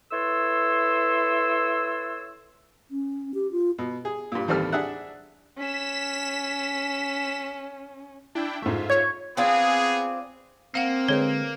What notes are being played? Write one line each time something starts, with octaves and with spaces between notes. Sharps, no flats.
E4 A4 B4 C#5 C6 E6
C#4
G4
F4
B2
G#4
G2 A#2
A1 D#2 G3 C4 A4 F6
D4 G#4 E5 F#5
C#4 B6 E7
D4 E4 G5
G#2 A3 F4 E5
C#5 G#6
B3 C4 D4 F4 G#4
A#3 C4 F5 F#5
D3 G#3 B4 C#5